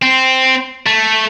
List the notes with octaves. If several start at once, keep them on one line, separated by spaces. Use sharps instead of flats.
C4
A3